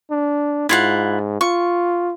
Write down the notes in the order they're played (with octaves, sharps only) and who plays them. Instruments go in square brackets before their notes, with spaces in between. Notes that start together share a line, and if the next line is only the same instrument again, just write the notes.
[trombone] D4
[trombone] G#2 [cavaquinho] E4 F4 F#5
[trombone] F4 [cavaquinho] C#6